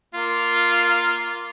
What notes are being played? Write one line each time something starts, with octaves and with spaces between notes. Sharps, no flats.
A#3 F4